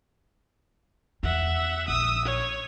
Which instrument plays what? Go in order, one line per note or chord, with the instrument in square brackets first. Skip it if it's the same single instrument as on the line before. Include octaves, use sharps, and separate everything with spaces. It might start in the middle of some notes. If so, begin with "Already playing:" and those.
[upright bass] E2 [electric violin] E5 F#5
[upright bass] A#1 [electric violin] D#6 E6
[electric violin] C#5